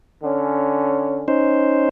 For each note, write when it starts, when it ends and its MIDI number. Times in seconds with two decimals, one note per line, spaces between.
0.24 1.26 50
0.24 1.26 61
1.28 1.89 61
1.28 1.89 63
1.28 1.89 72